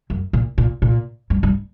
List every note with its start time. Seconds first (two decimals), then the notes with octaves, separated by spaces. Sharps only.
0.10 F#2
0.33 A#2
0.58 A#2
0.82 A#2
1.30 G2
1.43 G2